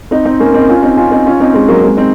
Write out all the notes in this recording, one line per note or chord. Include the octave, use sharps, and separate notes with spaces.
C4 D#4
C4 D#4
A#3 C#4
C4 D#4
C#4 F4
C4 D#4
C#4 F4
C4 D#4
C#4 F4
C4 D#4
G#3 C4
F#3 A#3
G#3 C4
C4 D#4